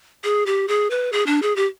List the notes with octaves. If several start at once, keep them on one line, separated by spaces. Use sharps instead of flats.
G#4
G4
G#4
B4
G#4
D4
G#4
G4